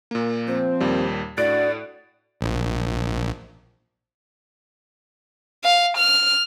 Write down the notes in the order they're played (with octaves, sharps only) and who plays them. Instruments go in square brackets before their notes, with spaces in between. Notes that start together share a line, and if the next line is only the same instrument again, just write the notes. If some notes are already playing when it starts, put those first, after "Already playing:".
[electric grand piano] A#2 A#3
[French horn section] F3 C4 [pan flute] C5
[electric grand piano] D#2 A#2 G3
[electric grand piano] A2 F#6 D7 [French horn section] D4 F#4 [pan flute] D5
[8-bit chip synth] A#1
[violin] F5
F6